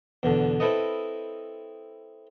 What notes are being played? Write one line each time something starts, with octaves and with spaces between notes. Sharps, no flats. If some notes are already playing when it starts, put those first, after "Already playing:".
E2 B2 D3
C4 E4 A4 B4 D#5